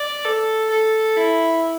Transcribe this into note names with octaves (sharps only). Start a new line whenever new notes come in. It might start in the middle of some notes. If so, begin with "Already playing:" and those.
Already playing: D5
A4
A4
E4